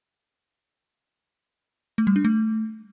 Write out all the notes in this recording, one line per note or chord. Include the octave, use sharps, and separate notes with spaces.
A3
G3
D4
A3